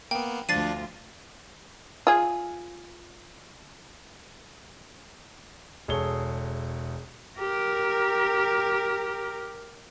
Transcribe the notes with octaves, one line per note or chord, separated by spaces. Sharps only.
A#3 B3 G5
D2 F3 D4 F4 A6 C7 D#7
F4 G#4
E1 G#4 A4 C#5 G7
G4 A#4